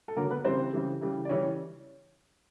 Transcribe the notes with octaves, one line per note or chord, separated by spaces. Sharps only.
A4
D3 F#3 A#3 A#4
B3 B4
C#3 E3 G3 C4 C5
C#3 E3 G3
C#3 E3 G3
D5
C#3 E3 G3 C#4 C#5